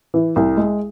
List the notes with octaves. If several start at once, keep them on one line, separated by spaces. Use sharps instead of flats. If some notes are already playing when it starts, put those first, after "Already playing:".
E3
C2
G#3